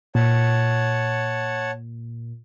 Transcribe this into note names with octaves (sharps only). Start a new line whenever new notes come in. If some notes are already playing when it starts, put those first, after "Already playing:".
A#2 C#5 F#5 A5